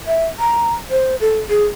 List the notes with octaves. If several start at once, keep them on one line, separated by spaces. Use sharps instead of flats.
E5
A#5
C5
A4
G#4